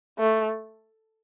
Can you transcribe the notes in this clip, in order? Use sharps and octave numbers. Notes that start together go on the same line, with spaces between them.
A3